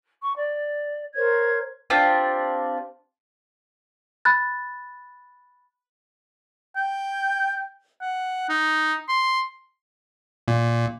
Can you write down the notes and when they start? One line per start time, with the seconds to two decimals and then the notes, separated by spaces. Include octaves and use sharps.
0.22 C#6
0.36 D5
1.15 A#4 C5 C#5 G#6
1.90 C4 D4 F4 G4
4.25 B5 F#6 A6
6.76 G5
8.01 F#5
8.49 D#4
9.09 C6
10.48 A#2